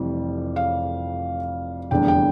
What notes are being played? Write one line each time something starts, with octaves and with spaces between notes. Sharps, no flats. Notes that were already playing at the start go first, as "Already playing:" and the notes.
Already playing: F1 F2 E3 G3
F5
F1 E2 D3 G3 D4 G5
G5